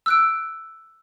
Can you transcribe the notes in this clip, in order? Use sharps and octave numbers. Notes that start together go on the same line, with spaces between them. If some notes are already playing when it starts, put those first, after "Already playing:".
E6 F#6 D7